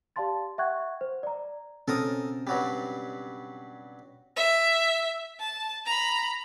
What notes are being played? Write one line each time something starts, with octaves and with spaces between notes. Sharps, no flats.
G4 D5 F5 A5 C6 A6
E5 F#5 G5 C#6 F#6 G#6
C5
D5 A#5
B2 C4 C#4 A4 A#4 D#6
G2 F#3 G3
E5
A5
A#5 B5